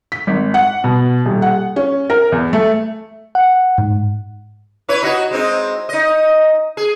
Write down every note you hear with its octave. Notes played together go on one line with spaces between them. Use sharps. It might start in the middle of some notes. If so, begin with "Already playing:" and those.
B6
G#1
F#5
B2
D#1
F#5
C#4
A#4
E2
A3
F#5
G#2
E4 B4 C#5
D#4 F#4
G#3 C4 D#4
D#4 D#5
G#4